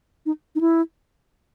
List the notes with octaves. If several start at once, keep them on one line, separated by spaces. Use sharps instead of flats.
D#4
D#4
E4